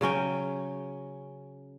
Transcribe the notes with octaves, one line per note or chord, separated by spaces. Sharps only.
C#3 F#3 C#4 G5